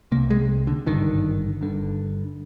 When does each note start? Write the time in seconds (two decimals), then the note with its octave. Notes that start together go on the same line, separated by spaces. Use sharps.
0.12 C3 A#3
0.15 C2
0.30 G#3
0.67 D3
0.86 G#1 G2 D3 D#3
1.61 G1 G2 D3